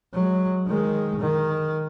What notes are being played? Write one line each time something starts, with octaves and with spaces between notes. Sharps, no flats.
F#3 G#3
D#3 G#3
D#3